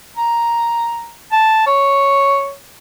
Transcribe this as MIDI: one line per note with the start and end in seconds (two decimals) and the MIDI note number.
0.17 1.11 82
1.32 1.65 81
1.66 2.52 73